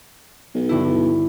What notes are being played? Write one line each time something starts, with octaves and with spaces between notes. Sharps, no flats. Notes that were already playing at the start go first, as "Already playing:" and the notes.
B1
G2 D3 E4